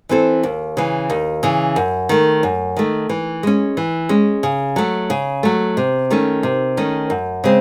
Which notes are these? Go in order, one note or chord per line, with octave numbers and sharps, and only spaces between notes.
E3 C4 E4 A4
D#2
C#3 E3
D#2
C#3 E3
F#2
D#3 A3
F#2
D#3 A3
E3
G#3 C#4
E3
G#3 C#4
C#3
F#3 A3
C#3
F#3 A3
C3
D#3 A3 C#4
C3
D#3 A3 C#4
F#2
C#3 G#3 C4